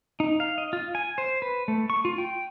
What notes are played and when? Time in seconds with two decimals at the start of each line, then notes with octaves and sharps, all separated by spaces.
0.20 D#4
0.40 F5
0.58 D#5
0.73 F4
0.95 G#5
1.18 C5
1.42 B4
1.68 A3
1.90 C#6
2.05 F4
2.18 G5